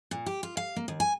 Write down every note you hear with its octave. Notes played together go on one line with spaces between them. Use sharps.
A#2
G4
F4
F5
A#3
D#2
G#5